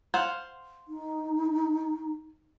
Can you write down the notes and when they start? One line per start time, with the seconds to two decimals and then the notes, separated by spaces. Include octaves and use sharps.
0.14 C5 F5 F#5
0.88 D#4